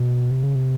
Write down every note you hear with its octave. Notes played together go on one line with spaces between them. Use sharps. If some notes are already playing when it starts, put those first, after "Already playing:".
Already playing: B2
C3
C#3
C3